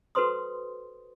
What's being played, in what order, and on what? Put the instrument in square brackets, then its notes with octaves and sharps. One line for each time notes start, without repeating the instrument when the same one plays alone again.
[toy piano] F#4 A4 B4 C5 C6 D#6